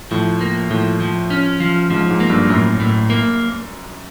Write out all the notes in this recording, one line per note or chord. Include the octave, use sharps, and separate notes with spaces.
A2 F3
A#3
A2 F3
F3
C#4
F3
G#2 F3
G#2
A#3
G2
F#2 A2
A2
A#3